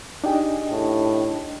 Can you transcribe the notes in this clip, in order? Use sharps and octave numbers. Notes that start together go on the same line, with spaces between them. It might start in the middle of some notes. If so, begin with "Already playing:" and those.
D4 D#4 G4 G#4 D#5 G5
A2